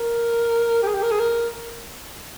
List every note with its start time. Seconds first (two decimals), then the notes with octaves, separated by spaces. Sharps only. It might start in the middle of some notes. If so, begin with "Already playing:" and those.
Already playing: A#4
0.83 G4
0.87 G#4
0.94 G4
1.03 A#4
1.11 G#4
1.19 A#4